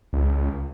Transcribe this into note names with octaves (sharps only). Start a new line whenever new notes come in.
C#2